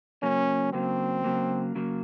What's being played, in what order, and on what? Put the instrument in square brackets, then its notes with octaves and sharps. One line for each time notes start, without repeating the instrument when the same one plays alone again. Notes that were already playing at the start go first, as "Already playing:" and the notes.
[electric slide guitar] C#3 F#3 A#3 [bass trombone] C#4
[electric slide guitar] C#3 F#3 A#3 [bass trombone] C4
[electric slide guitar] C#3 F#3 A#3
C#3 F#3 A#3